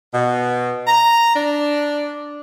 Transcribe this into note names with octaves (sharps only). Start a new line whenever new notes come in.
B2
A#5
D4